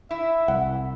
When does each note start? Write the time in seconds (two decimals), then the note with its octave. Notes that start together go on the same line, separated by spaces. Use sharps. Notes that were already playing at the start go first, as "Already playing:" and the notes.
0.11 E4 E5
0.48 C2 F#5